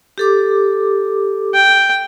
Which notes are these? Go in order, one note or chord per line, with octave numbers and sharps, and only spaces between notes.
G4 A4 D6
G5